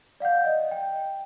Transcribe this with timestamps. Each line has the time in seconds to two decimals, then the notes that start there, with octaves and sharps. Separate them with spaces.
0.20 D5 F5 F#5 G6
0.45 D#5
0.71 G5